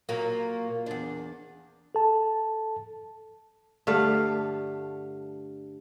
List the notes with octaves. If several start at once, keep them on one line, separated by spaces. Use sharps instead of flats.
A#2 F#3 A#3
E2 D4
A4 A5
G2 D3 A3 F5